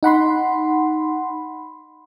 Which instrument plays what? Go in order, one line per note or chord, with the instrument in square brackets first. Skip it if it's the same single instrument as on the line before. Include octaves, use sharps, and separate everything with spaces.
[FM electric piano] D#4 F#5 B5 C6